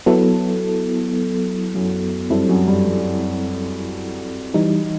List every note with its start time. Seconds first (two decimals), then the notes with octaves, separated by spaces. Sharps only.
0.06 F#3 B3 E4 A4
1.74 F#2
2.30 G2 F#3 C4 E4 A4
2.49 F#2
2.68 G2
2.87 G2
4.54 E3 G3 D#4